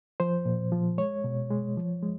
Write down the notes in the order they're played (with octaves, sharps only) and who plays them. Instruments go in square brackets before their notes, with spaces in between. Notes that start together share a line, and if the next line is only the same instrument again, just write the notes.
[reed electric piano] F3 C5
A#2
F3
G#3 C#5
B2
G#3
F3
G#3